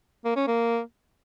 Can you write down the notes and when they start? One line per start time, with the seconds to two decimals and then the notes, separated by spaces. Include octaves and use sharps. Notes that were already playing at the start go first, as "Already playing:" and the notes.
0.25 A#3
0.36 C#4
0.47 A#3